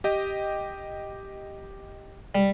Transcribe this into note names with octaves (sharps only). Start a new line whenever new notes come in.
G4 D#5 G5
G3